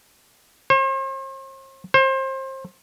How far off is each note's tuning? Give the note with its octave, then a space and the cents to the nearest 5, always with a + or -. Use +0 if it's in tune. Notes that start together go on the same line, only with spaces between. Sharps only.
C5 +45
C5 +30